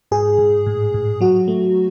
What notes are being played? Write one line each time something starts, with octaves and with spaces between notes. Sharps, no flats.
G#2 G#4
G#2
A2
A2
F#3 F#4
A3